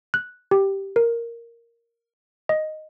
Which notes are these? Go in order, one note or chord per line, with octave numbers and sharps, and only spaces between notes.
F#6
G4
A#4
D#5